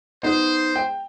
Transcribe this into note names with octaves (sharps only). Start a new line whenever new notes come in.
B3 D#4 C5
G5